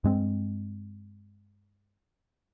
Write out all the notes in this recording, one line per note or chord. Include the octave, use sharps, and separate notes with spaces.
G2 G#3 C4